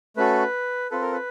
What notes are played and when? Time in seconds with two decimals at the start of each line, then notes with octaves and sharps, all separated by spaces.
0.17 A3 C#4 F#4 A4 B4
0.91 C4 F4 A4 B4
1.02 A#4
1.13 B4